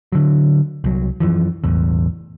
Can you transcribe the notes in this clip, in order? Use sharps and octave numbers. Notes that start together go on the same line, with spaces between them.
D3 F#3
C2 F#3
F#2 E3 F3
E1 A1 E2